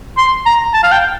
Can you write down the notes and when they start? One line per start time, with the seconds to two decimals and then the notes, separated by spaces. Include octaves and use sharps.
0.17 C6
0.46 A#5
0.74 A5
0.83 F5
0.92 G5